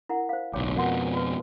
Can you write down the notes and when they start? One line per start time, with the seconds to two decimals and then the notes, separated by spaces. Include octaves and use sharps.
0.09 E4 A#4 F#5
0.29 C5 F5
0.53 D1 B1 C#5 G5 D6
0.76 F2 B2 A#4 F#5 C6
1.13 F4 F#4 B4